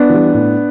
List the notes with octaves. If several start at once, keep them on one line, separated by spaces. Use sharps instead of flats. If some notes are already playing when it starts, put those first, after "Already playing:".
Already playing: B3 D4
E3 G3
A2